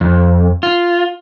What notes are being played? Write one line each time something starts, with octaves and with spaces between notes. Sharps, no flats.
F2
F4